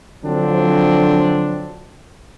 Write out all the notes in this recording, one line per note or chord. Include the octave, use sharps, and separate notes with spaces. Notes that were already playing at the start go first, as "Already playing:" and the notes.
D3 F3 F#3 C4 D4